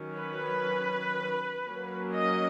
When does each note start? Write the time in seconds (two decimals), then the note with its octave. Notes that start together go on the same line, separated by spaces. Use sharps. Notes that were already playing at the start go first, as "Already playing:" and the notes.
Already playing: D#3 F#3 C#4
0.17 B4
1.66 F#3 A#3 C#4
2.15 D#5